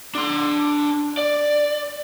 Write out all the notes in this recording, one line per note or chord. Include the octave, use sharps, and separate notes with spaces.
D4 C6
D5